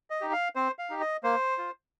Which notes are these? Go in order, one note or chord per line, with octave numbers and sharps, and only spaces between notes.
D#5
D#4 G4
F5
C4 C5
F5
D#4 G4
D#5
A#3 C5
F4